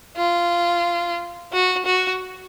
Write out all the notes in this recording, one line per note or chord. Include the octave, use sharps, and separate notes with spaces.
F4
F#4
F#4